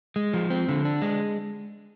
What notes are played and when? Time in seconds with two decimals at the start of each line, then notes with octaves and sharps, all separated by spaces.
0.16 G#3
0.34 F3
0.50 C4
0.69 D3
0.85 D4
1.02 G#3